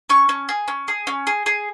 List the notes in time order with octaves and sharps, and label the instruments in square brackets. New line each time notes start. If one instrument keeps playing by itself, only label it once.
[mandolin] C#4 C#6
C#4
G#4
C#4
G#4
C#4
G#4
G#4